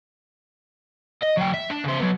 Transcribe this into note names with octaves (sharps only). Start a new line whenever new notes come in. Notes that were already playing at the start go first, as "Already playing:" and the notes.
D#5
F#3 G5
E5
D4
C#3 C5
F#3 B3